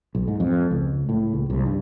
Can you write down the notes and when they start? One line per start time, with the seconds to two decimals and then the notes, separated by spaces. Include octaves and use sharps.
0.15 B1
0.28 G#2
0.40 F2
0.71 C#2
1.09 A2
1.33 C#2
1.50 C2
1.66 G2